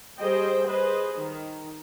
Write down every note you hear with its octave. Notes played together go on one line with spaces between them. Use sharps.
G3 G#4 C5 D#5 G5
G#4 B4 C5 D#5
D#3